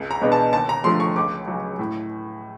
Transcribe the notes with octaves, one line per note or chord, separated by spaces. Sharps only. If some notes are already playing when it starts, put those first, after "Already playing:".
Already playing: C#2
A#5
B2 G#3 B3 D4
A5
D#2 A5
A#5
D3 F3 A3 C6
C#6
C#2 D6
C#3 F#3
A2